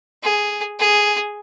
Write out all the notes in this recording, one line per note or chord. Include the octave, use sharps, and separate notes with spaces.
G#4
G#4